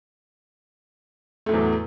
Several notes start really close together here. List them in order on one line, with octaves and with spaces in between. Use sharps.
A3 A2 F#3 E2